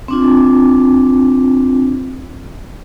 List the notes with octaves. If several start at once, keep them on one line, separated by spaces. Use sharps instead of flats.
C4 D4 F4